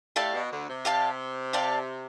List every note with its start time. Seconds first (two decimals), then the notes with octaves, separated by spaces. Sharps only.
0.16 A2 A3 G4 D5 F5 A5
0.34 B2
0.50 D2 D3
0.67 C3
0.85 G4 D5 F5 A5
1.53 G4 D5 F5 A5